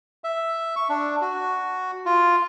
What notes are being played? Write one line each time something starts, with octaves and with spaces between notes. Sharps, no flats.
E5
C#6
D4
F#4
F4